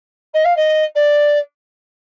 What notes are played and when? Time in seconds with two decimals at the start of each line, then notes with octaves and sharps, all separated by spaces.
0.34 D#5
0.45 F5
0.56 D#5
0.95 D5